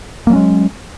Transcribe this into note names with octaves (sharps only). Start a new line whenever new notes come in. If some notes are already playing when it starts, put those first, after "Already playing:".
F#3 G#3 A#3 C#4